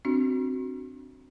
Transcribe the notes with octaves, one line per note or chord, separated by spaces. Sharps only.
C4 D4 F#4